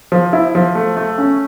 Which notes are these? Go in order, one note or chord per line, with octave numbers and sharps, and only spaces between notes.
F3
E4
F3
A3
A3
C#4